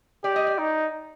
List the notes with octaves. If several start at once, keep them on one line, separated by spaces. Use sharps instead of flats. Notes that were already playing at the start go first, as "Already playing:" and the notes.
G4 D5
D#5
D5
D#4